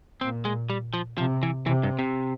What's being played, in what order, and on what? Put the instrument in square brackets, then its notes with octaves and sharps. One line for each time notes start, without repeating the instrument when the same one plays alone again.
[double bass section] A#2 [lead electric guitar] C4
[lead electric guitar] G#3
G3
F3
[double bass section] C3 [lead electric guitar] F3
[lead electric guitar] E3
[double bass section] C3 [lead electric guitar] E3
[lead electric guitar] G2
C3